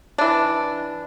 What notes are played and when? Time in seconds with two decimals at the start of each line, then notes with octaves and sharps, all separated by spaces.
0.18 E3 D4